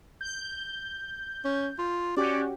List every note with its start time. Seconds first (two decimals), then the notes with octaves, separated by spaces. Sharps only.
0.21 G6
1.45 C#4
1.78 F4
2.17 C#4 F#4 G4 D5